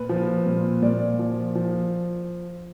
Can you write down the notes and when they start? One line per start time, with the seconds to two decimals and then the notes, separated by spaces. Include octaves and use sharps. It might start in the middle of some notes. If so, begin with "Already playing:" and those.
Already playing: A#2 B4
0.09 F3
0.46 A#2
0.82 A#2 D5
1.19 F3
1.55 F3